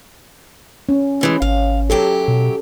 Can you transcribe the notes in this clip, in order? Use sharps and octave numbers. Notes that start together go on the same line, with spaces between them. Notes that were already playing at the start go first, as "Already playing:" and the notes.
C#4
A2 E3 G#3
G#1 C#5 F5
F#2 F#3 G4 A4
B2